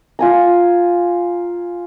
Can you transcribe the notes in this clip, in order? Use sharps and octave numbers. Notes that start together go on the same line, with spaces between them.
F4 G#5 A#5